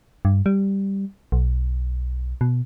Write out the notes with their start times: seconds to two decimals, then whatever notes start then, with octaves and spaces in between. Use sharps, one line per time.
0.25 G2
0.46 G3
1.32 B1
2.41 B2